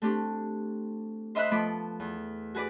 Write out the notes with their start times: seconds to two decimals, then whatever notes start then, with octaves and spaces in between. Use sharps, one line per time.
0.02 A3 C4 D4 G4
1.35 C5 D#5 E5 B5 C6 F#6
1.51 F3 A3 B3 B5 D6
2.00 E2
2.55 F#4 G#4 B4 D5